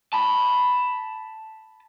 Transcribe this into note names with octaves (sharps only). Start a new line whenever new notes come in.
A5 B5